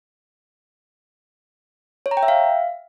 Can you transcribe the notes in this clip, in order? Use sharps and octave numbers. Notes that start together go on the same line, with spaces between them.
C#5
A#5
G5
E5
F5